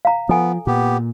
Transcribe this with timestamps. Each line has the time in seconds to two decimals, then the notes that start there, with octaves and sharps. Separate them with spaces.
0.05 F5 A#5
0.29 F3 B3 A4 G#5
0.67 A#2 B3 G4